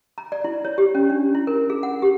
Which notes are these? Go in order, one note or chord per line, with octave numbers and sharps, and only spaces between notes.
A#5
D5
E4
C#5
G4
C#4
D4
E4
A#4
G#4
F#5
G4